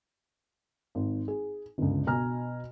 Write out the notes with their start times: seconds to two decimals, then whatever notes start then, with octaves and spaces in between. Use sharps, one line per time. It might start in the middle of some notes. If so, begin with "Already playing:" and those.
0.95 G#1
1.28 G#4
1.78 G1 C#2
2.07 B2 G#5 A#5 F6